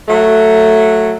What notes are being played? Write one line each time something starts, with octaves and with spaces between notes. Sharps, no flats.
F#3 A3